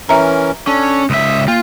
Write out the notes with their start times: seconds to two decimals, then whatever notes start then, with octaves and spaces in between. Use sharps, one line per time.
0.09 E3 C#4 A#4 E5 A#5
0.67 C#4 D4 A4
1.10 C#2 E5 D#6
1.48 A#3 F4